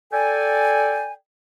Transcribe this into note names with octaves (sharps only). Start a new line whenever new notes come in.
A4 D5 G5 G#5